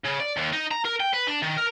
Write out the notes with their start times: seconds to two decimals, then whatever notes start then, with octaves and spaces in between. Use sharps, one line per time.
0.04 C#3
0.20 D5
0.37 D#2
0.53 D#4
0.71 A#5
0.85 A#4
1.00 G5
1.13 B4
1.27 D4
1.42 D#3
1.57 A#4